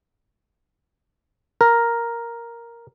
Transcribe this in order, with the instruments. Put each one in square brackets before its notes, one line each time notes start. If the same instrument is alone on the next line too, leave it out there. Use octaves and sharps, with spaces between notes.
[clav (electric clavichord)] A#4